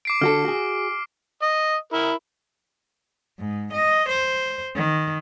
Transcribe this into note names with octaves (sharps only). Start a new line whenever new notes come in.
D6 C7 D7
D3 F#4 A4 F6
F#4 G#4
D#5
E4 A#4
G#2
D#5
C5
D#3